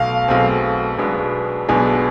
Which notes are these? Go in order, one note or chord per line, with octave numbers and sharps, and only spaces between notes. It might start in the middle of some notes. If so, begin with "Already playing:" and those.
Already playing: B1 B2 A3 F5
B1 B2 A3 C4 G#4
B1 B2 G#3 B3 D4
B1 B2 G#3 B3 D4 G#5
G#5